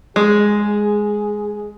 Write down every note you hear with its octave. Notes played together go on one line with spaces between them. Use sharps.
G#3 G#4